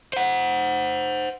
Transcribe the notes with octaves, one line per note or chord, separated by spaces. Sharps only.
C5 F#5